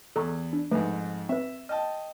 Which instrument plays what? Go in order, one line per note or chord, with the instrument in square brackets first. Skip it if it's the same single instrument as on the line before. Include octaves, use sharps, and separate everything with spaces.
[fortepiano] E2 [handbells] A4 A#5 C#6
[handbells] D4
[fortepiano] F2 G#2 [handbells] A3 B4
[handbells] C4 B4 [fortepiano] E5
[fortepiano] D#5 G5 A5 [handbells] F6